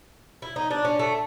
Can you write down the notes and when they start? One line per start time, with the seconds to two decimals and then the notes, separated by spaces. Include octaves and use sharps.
0.42 E4
0.56 D#4
0.71 D4
0.85 C#4
0.99 A3